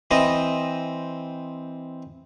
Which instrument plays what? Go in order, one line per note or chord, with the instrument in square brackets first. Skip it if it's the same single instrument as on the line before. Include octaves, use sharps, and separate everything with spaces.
[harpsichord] E3 C4 D#5